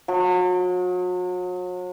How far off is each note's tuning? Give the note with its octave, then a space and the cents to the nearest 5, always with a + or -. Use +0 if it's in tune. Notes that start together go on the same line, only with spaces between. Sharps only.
F#3 -40